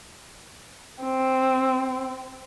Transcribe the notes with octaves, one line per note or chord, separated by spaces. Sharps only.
C4